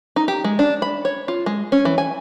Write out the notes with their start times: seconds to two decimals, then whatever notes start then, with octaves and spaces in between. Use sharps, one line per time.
0.16 D#4
0.28 G4
0.44 G#3
0.59 D4
0.82 B5
1.05 C#5
1.28 F4
1.46 G#3
1.72 C#4
1.85 E3
1.98 G#5